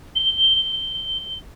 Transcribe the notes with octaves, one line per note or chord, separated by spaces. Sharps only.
G7